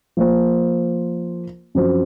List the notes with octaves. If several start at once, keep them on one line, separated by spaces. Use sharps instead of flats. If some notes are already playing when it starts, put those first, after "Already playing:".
F3 A#3 F4 C5
F#2 F3 C4 F#4 C5